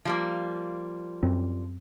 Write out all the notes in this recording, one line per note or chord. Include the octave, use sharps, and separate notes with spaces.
F3 G3 A#3
F#2 C4